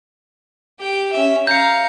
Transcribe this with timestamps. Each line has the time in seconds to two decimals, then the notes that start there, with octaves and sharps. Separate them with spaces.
0.80 G4 G5
1.13 C#4 E5
1.47 F5 A#5 G6 C#7